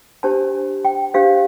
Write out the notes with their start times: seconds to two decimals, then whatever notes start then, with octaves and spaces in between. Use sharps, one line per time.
0.23 D4 G4 C5 A5
0.85 G5
1.14 D4 G4 C5 F5